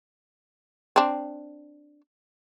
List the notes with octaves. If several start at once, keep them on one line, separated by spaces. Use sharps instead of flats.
C4 D4